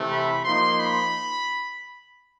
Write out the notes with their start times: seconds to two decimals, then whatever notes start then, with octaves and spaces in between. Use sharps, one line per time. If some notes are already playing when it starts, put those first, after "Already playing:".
Already playing: C3 E3 A3
0.10 B5
0.44 F3 A#3 D#4 C6
0.78 B5